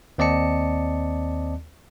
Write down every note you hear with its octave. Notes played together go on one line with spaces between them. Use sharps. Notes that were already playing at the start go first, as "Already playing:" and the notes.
D#2 C4 D5 D#5 A5 C#7